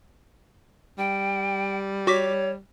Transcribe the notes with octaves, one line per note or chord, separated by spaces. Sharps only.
G3 G5
F#4 C#5 D6 B6